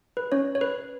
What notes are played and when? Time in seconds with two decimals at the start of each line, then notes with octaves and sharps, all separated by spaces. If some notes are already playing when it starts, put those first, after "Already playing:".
0.17 B4
0.32 C#4 C#5
0.55 C#5
0.61 B4